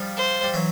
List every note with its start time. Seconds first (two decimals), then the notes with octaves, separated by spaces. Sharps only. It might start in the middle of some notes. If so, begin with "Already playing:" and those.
Already playing: F3 G3
0.16 C5
0.43 G3
0.53 E3 F#3